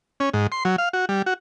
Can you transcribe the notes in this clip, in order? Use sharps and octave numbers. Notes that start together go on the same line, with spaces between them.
C#4
G#2
C6
F#3
F5
F#4
G3
F#4